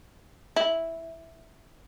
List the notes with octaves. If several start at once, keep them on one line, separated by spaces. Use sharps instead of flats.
E4